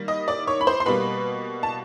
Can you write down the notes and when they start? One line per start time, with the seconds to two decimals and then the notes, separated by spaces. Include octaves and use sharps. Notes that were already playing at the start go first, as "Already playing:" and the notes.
Already playing: D#3 G3 A#3
0.08 D#5 D#6
0.28 D5 D6
0.47 C#5 C#6
0.61 B5
0.67 C5 C6
0.80 C6
0.86 B2 G3 A#3 B4 B5
1.63 A5